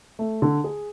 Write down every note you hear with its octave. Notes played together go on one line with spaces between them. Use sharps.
A3
D3
G#4